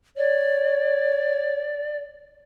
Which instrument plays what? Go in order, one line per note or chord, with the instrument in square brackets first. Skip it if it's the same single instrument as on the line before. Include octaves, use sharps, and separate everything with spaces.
[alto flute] C#5 [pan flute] D5